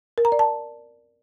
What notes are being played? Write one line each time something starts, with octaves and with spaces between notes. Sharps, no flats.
A#4
A#5
D5
A5